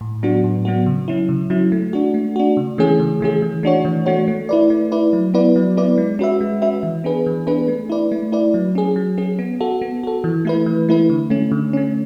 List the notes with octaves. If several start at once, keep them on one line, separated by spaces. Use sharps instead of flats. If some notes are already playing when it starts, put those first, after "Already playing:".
A2
F#3 B3 D4 F#4
A2
F#3 B3 D4 F#4
C#3
F#3 C#4 E4
C#3
F#3 C#4 E4
A3
D4 F#4
A3
D4 F#4
C#3
E3 A3 C#4 G#4
C#3
E3 A3 C#4 G#4
E3
A3 D4 F#4 C#5
E3
A3 D4 F#4 C#5
A3
E4 B4 D5
A3
E4 B4 D5
F#3
B3 E4 B4 D5
F#3
B3 E4 B4 D5
G#3
C#4 F#4 B4 E5
G#3
C#4 F#4 B4 E5
E3
B3 D4 G#4 B4
E3
B3 D4 G#4 B4
A3
E4 B4 D5
A3
E4 B4 D5
F#3
C#4 G#4
F#3
C#4 G#4
B3
F#4 A4
B3
F#4 A4
E3
A3 E4 B4
E3
A3 E4 B4
D3
A3 C#4
D3
A3 C#4